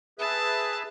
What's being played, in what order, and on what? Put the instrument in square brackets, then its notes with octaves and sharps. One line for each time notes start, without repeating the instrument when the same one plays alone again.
[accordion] G#4 B4 E5 [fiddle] A5